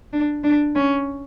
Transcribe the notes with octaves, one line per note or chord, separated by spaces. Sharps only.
D4
D4
C#4